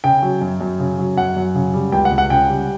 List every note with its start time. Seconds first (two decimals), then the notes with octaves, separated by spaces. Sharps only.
0.04 C#3 G5
0.22 F#3
0.41 F#2
0.61 F#2
0.80 C#3
0.99 F#3
1.17 F#2 F#5
1.36 F#2
1.55 C#3
1.74 G3
1.92 C#2 G5
2.05 F#5
2.11 C#2
2.18 F#5
2.30 C#3 G5
2.49 G3